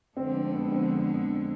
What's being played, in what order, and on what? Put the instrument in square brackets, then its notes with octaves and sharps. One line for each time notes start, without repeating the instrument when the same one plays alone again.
[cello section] F2 D3 G#3 [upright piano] C4
[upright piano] C4
B3
C4